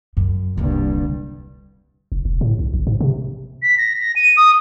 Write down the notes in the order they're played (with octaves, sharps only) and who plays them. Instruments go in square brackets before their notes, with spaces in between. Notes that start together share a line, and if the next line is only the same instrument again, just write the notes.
[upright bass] F#2
[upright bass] D#1 D3 [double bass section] C2 G2
[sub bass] F1
E1
A2
B1
G#1
G#2
C3
[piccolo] B6
A#6
A#6
D#7
D#6